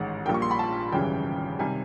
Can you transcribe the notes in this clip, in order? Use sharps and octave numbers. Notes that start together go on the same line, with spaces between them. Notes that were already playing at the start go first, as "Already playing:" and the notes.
Already playing: A1 G#2 D#3 G#3 F#5
A#1 A#2 G3 A#3 G5
C#6
C6
B5
A5
G#1 F#2 C#3 E3 G3 G5
C3 D#3 G3 G#5